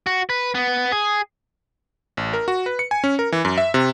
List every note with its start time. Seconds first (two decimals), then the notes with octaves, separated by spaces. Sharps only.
0.07 F#4
0.30 B4
0.55 B3
0.92 G#4
2.17 A1
2.33 A#4
2.48 F#4
2.66 B4
2.79 C#7
2.91 G#5
3.04 C#4
3.19 A#4
3.32 E3
3.45 F#2
3.58 E5
3.74 C3